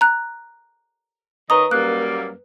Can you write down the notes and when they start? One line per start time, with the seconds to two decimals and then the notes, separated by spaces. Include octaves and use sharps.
0.01 A#5 F#6
1.50 D#3 B4 C#5 D#5 A#5 D#6
1.71 F#2 G3 A#3 F#6